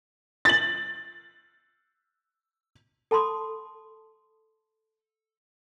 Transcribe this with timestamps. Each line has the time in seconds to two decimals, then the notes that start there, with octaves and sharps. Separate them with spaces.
0.45 A6 F#7
3.11 A4 A5 B5 C6 D#6